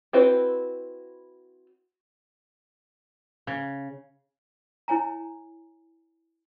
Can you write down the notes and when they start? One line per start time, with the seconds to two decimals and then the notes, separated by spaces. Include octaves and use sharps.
0.13 C4 E4 F#4 B4 C5
3.47 C#3
4.88 E4 C#5 G#5 A#5